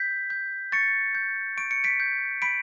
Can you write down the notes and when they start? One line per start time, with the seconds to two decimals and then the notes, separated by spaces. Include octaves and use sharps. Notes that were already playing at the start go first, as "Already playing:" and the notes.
Already playing: G6 B6
0.30 G6
0.72 C#6 A6 C#7
1.15 G6
1.57 C#6 D7
1.71 C#7
1.84 B6 D7
2.00 G6
2.42 B5 B6 D7